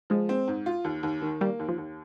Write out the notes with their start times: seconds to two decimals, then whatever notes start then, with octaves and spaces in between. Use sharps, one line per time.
0.10 F3 G#3
0.29 C4
0.48 G#2
0.66 F4
0.84 D#2
1.03 D#2
1.22 D#3
1.41 G3 A#3
1.59 D#2
1.68 F3
1.78 D#2